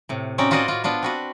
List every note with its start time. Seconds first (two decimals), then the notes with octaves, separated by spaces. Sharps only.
0.09 A2 C3
0.38 C4 C#4 D#4 F#4 D5
0.51 F4 F#4 B4 C5 D5 D#5
0.68 F4 F#4
0.84 B3 D4 F4 C5
1.03 C4 F#4 B4